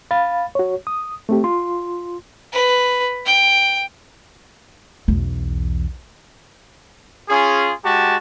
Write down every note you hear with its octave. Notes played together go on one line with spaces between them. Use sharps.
F5 B5 A6
F#4 C#5
D#6
A3 C4 G4
F4 C6
B4
G5
B1 E2
C#4 F4 G#4
G#3 F#4 G4 A5